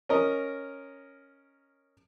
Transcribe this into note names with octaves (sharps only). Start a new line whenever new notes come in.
C#4 A#4 D#5